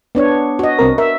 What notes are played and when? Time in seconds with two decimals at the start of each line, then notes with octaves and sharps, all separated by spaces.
0.15 B3 D4 C#5
0.59 F#4 D#5
0.79 C2 C4 A#4
0.98 A#4 E5